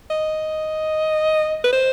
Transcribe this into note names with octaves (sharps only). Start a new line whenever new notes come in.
D#5
B4
C5